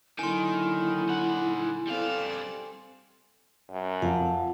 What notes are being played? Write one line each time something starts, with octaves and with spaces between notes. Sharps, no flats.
D3 D#3 F#3 A#3 E4 G#5 C6
D#4 F#5
G3 C4 A4 D5 F5
F#2
F2 F5 F#5 A5